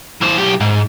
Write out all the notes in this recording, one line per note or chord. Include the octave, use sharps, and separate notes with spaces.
E3 C5
B1 G4
G#2